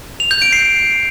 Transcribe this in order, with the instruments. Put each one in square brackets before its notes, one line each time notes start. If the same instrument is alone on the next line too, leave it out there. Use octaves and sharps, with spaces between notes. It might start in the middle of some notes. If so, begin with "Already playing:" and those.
[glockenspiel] F7
G6
D7
C7